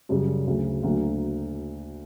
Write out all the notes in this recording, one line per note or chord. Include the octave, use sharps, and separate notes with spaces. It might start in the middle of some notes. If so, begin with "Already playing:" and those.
F#2 C#3 G3
D2 C#3 F#3
D2 D3 F#3 A#3